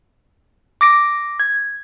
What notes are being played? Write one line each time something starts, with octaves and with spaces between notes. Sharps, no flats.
D6 A#6 D7
G#6